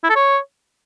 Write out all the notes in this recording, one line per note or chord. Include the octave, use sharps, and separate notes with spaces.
E4
A4
C#5